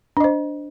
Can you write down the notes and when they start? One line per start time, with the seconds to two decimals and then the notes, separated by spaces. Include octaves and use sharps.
0.17 D4
0.20 D#5
0.24 C5